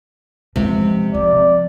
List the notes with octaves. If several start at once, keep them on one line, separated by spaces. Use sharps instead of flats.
C3 F3 G#3
F3 D5